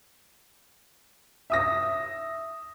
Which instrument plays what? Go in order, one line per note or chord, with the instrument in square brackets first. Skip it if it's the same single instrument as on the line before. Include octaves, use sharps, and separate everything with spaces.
[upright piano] E5 D#6 A#6